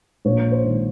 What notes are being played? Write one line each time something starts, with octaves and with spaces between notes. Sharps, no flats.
A#1 C#5
C5
G#2 D#3